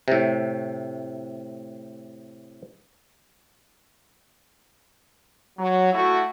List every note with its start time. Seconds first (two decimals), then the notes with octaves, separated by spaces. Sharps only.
0.08 A2 C3
5.58 F#3
5.93 A3 E4 F#4